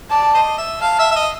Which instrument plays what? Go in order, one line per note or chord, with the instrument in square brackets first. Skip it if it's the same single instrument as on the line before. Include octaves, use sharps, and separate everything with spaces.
[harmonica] D5 [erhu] A5
[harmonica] C5 D#5
E5
[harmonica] F5 [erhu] A5
[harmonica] E5
E5
D#5